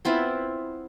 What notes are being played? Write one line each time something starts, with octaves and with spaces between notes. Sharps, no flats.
B3 C4 E4 F4